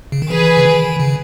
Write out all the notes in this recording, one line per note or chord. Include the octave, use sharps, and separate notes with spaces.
C#3
D#3
E3 G#4 B4
C#3
D#3
C#3